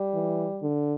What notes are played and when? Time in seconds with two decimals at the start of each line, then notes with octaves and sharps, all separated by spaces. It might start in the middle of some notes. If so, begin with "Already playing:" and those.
Already playing: G3
0.14 E3
0.62 D3